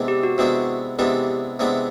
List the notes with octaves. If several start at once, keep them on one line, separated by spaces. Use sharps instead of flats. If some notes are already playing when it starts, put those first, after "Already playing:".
Already playing: C3 E3 G#3 B3 D4
G4
F#4
C3 E3 G#3 B3 D4 F#4
C3 E3 G#3 B3 D4 G4
C3 E3 G#3 B3 D4